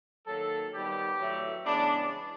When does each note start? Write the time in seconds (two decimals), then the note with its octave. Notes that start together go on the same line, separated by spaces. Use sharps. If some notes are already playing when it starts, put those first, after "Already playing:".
0.26 D#3 F#3 A#3 A4
0.72 D#3 G3 B3 G4
1.18 A2 F#3 A3
1.65 C#3 E3 G#3 B3 D4